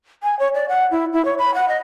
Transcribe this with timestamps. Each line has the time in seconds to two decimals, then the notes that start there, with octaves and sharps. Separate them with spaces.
0.23 G#5
0.39 C#5
0.54 D5
0.69 F#5
0.91 E4
1.13 E4
1.25 C#5
1.38 B5
1.54 F#5
1.68 D#5